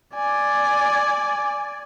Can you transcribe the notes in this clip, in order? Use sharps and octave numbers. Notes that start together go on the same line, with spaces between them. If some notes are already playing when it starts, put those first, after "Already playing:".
D5 G#5